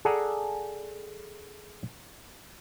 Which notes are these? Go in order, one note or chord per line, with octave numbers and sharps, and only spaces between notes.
G#4 A4 D5 F#5 G#5 A#5